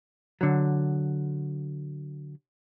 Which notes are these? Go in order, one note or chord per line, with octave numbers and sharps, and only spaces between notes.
D3 F#3